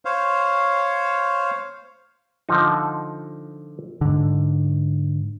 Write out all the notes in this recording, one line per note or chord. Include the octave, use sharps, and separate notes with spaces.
C5 C#5 F5
D3 F3 D#4
G#2 D3